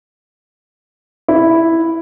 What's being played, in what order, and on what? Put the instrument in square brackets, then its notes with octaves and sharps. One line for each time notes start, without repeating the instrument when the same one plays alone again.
[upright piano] E4